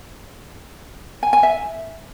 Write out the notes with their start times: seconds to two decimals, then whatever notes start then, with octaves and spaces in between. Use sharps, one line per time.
1.23 G#5
1.33 G#5
1.43 E5